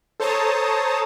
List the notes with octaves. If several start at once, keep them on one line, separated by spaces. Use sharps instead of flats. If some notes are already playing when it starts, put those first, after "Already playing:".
A4 C5 C#5 A5 A#5 D#6